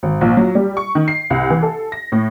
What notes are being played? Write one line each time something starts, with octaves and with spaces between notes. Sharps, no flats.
G#1
A#1
F#3
G3
C#6
D#3
C7
C2
E3
A4
A#6
A2